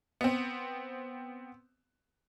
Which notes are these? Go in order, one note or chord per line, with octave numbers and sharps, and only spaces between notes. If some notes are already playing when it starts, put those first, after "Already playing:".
B3 C4